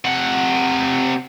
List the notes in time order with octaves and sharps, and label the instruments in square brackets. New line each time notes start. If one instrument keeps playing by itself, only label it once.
[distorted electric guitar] C3 F#5